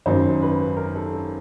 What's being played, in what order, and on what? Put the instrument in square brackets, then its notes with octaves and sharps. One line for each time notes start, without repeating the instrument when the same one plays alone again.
[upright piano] G#1 F#2 D#3 F#3 C5
B4
A#4
A4
A4